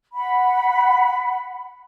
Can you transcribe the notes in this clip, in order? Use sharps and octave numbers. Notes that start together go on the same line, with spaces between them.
F#5 B5